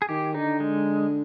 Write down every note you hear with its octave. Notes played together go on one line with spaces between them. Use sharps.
G#4
D#3 G4
D3 D#4
G#3